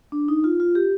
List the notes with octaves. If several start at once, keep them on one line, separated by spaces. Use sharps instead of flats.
D4
D#4
F4
F4
G4